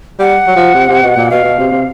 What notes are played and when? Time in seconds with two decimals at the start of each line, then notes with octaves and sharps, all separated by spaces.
0.19 G3 F#5
0.47 F#3
0.56 F3
0.74 C3
0.89 C3
1.03 B2
1.17 A#2
1.30 B2 F5
1.44 B2
1.59 C3
1.72 C3